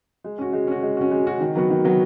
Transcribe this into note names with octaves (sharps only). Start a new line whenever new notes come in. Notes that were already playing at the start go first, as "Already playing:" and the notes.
G#3
C#4 F#4
G#3
C#4 F#4
G#3
C#4 F#4
G#3
C#4 F#4
D#3
F#3 B3 F#4
D#3
F#3 B3 F#4